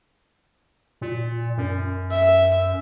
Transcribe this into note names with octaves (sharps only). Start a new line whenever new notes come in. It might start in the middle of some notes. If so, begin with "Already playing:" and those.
A#2
F#2
E5